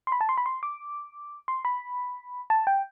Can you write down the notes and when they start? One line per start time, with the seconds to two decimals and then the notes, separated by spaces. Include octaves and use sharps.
0.07 C6
0.12 B5
0.21 A5
0.29 C6
0.38 B5
0.46 C6
0.63 D6
1.48 C6
1.65 B5
2.50 A5
2.67 G5